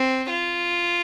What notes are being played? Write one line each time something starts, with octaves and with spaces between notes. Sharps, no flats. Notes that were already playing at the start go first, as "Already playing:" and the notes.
Already playing: C4
F4